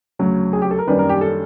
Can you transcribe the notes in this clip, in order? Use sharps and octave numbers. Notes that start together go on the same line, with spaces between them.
D2 C#3 F#3
G#4
G4
A4
A#4
F#2 D#3 G3 A#3 D4 B4
A#4
G4
A4